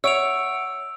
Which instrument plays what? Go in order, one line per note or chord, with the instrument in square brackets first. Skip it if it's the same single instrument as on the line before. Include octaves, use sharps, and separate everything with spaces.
[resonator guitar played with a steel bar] C#5 [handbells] E5 F#5 D7 [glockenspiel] E6 F7